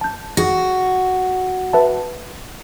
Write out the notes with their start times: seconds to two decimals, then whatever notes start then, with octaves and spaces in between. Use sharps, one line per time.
0.01 A5 G6
0.37 F#4 G#4 A#6
1.73 B4 E5 A5